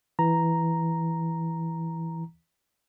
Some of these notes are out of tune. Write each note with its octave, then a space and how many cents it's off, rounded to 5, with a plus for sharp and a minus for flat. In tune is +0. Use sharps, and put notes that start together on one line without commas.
E3 +0 A#5 +0